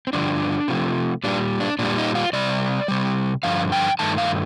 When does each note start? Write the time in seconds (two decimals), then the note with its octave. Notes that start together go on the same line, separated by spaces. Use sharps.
0.07 C4
0.13 G2 D3 F3 D4
0.68 C3 F3 A3
1.24 A#2 G3 D4
1.60 D4
1.79 A#2 G3 D4
1.98 D#4
2.15 F4
2.33 C3 G3 D5
2.88 C3 G3
3.43 G2 D3 F3 F5
3.72 G5
3.99 G2 D#3 A3 A5
4.18 F5